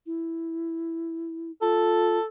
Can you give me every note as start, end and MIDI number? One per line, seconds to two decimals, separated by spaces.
0.06 1.51 64
1.62 2.18 65
1.62 2.28 69